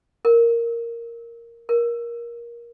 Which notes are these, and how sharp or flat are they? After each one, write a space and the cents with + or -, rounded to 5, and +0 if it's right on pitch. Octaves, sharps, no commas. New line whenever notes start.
A#4 -5
A#4 +20